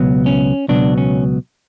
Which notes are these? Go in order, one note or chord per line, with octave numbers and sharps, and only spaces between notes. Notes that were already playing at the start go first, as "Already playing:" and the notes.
Already playing: C#2 B2 F#3 B3
C#4
C#2 B2 F#3 B3 D4
C#4